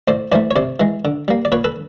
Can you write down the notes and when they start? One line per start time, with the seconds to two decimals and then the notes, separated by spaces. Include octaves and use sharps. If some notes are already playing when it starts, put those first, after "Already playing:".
0.08 A2 C5 D5
0.32 E3 A3 C5 D5
0.51 C#5
0.56 C3 C5 D5
0.80 E3 G#3
1.05 D3
1.28 G3 A#3
1.45 D5
1.52 A#2 B4 C#5
1.64 A4 B4